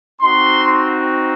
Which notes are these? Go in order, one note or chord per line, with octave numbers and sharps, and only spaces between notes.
C4 D#4 F#4 C6